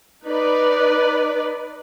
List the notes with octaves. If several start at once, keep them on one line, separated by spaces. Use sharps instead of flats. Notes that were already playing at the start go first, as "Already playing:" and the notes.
D#4 B4 D5